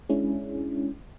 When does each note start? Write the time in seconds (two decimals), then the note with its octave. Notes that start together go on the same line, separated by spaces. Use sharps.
0.09 G#3 C#4 D4 E4 G#4